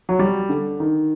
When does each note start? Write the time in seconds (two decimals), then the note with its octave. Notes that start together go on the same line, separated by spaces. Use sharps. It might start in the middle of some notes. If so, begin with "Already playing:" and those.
0.09 F#3
0.19 G3
0.49 D3
0.80 D#3